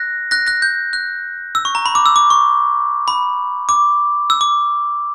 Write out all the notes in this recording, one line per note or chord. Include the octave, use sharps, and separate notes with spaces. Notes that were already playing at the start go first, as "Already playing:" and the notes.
Already playing: F#6 A#6
F#6 A#6
F#6 A#6
G6
F#6
E6
C#6
A#5
B5
D6
E6
D6
C#6
B5
D6
E6
D6